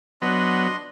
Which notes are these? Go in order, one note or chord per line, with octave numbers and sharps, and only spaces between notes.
F#3 B3 D4 D#5 C6